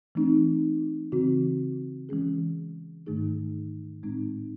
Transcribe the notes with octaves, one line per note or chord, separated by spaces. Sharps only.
E3 A3 C4 D#4
C#3 E3 C4 F#4
E3 G#3 C#4 G#4
G#2 D#3 A3 D#4 G#4
A2 G#3 C4 D#4